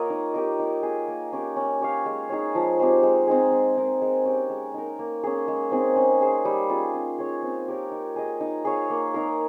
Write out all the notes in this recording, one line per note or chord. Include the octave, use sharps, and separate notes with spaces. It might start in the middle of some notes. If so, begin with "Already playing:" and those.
Already playing: A#3 F4 G4 A#4 C#5 D#5
D#4
G4 A#4 D#5
D#4
G#4 D#5
A#3
C#4 G4 A#4
C#4
G4 C#5 F5
G#3
D#4 G#4 C#5
F3
G#3 C4 G4
G#3
C4 D#4 G#4
G#3
D#4 A#4
G#3
C#4 G4
G#3
D#4 A#4
A#3
C#4 G#4
G#3
C4 D#4 G#4
C#4
G#4 C5
G3
C#4 F4 G#4
C#4
G#4 C#5 F5
C4
G4 A#4 C#5
D#4
G#4 D#5
D#4
G#4 C#5 F5
A#3
D#4 A#4 F5